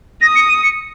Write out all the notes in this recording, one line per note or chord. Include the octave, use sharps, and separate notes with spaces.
D#6 A#6
C#7
D#7
C#7